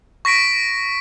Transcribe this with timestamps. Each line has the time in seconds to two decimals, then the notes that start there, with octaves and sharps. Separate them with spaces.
0.25 C#6 A#6 B6 D7